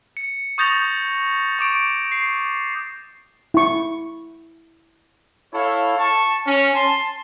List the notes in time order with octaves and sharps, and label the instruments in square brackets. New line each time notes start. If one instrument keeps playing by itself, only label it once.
[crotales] C#7
C#6 D#6 G6 A6 A#6 F7
C#6 D6 D7
C7
[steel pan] E4 C#6
[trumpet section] E4 A4 C#5 F5
A5 C#6
C#4
A5 C6